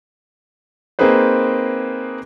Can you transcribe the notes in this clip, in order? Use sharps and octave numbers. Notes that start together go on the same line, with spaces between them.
A#3 C4 D#4 G#4 B4 C5